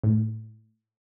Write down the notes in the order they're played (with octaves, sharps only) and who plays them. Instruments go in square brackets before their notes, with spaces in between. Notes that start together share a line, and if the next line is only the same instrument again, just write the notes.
[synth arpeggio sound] A2